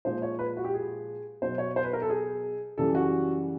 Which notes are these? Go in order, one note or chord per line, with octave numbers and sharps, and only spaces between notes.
A#2 F3 G#3 C5
C#5
B4
F#4
G4
G#4
B2 F#3 C5
C#5
C5
B4
A#4
A4
G#4
F#2 C#3 E3 G3 A4
F#4